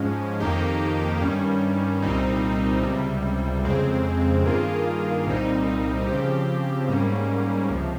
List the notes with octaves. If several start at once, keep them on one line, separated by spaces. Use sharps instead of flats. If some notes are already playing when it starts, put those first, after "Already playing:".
Already playing: G#2 F3 G#3 C#4
F2 D#3 A#3 D#4 G4
G2 D#3 G3 C#4
C2 A#2 G3 C4 D#4
C#2 C3 G3
F2 C#3 G#3 C4
G2 D#3 A#3 F4 G#4
C2 A#2 G3 C4 D#4
C#3 F3 C4 G4
G#2 G3 A#3 C#4
C#2 C3 F3